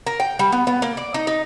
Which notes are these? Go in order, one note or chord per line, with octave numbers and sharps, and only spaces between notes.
A#4
G5
G3
B3
B3
A#3
D5
D#4
D#4